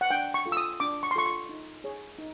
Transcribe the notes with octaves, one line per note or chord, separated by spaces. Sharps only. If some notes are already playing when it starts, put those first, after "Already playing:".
F#5
D4 G5
C#6
F4 A4
E6
D#6
D4 D6
C#6
C6
F4 A4 C#6
C#6
D#4
G#4 C#5
D#4